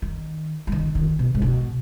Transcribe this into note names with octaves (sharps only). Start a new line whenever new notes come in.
D#3
F#3
D#3
D#3
B2
G#2
B2